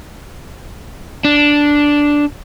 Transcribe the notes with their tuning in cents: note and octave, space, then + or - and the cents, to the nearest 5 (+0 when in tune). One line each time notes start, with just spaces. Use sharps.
D4 -5